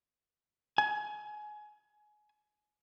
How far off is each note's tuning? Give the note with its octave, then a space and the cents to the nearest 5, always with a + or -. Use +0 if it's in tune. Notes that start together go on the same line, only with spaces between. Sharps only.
G#5 +25